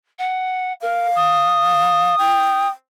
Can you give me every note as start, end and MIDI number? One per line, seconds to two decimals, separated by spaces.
0.18 0.72 78
0.82 1.07 70
0.82 2.15 77
1.15 2.67 87
2.18 2.67 79